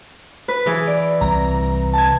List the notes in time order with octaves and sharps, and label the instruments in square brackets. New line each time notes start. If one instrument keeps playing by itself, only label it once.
[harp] B4
E3 G#4
[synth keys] D5
[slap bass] C2 [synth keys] A#5
[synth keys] A5 G#6